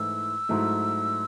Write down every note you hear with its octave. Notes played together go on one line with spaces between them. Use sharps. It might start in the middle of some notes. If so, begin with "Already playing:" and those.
Already playing: G#2 E3 A3 E4 E6
G#2 F#3 A3 E4